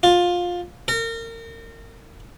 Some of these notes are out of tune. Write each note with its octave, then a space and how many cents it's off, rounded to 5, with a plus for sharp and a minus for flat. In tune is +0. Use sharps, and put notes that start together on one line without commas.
F4 +15
A#4 -30